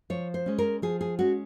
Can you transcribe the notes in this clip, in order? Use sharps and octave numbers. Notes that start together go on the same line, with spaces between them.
F3 C#5
C5
G#3 C#4
A#4
F3 G#4
G#4
G#3 C#4 F#4